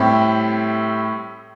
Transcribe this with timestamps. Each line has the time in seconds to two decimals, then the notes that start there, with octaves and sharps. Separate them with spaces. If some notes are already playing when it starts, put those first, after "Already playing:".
Already playing: A2 G3 C4 E4 G4